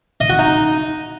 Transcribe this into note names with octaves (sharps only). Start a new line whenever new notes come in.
D#5
F#4
D#4